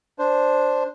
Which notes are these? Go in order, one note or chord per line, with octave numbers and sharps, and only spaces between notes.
D4 C5